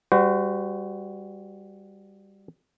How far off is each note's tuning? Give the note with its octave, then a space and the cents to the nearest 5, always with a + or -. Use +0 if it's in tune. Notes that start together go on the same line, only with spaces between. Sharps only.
G3 +15 F#4 +0 C5 -40